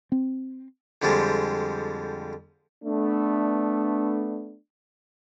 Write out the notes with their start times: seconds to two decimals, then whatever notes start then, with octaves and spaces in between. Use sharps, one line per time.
0.12 C4
1.02 F2 D3 F3 G3 G#3
2.84 A3 B3 D4